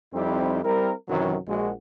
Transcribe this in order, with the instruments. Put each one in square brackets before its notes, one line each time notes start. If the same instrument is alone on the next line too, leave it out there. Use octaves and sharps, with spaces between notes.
[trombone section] F2 G3 C4 D#4 E4 G4
G3 C4 E4 A#4
F#2 C3 D#3 E3 F#3
A#1 G#3 F#4